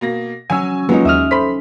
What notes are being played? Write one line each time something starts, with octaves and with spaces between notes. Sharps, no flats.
B2 A#3 A#6
F#3 C#4 G#5 E6
F#3 G#3 A#3 C#4 D#4 F4 B4
D#2 E5 D#6 F6
A4 C5 B5 C6 B6